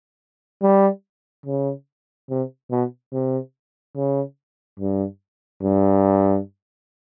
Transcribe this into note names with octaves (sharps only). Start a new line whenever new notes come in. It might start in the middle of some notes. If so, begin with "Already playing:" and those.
G3
C#3
C3
B2
C3
C#3
G2
G2